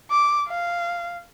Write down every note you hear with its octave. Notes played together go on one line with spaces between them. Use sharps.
D6
F5